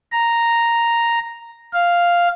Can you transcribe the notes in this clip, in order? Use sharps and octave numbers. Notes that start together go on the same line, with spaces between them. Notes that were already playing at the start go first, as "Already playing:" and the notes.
A#5
F5